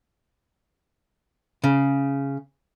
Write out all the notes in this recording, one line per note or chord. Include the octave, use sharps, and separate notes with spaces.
C#3